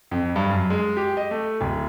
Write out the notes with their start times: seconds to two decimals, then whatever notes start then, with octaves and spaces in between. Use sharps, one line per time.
0.11 F2
0.36 G2
0.51 F#2
0.70 G#3
0.97 G4
1.17 D#5
1.31 A3
1.61 D1